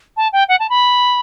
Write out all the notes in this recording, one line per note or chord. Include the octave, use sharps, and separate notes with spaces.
A5
G5
F#5
A5
B5